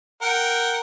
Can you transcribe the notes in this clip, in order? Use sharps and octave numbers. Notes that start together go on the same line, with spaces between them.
A#4 F#5 G5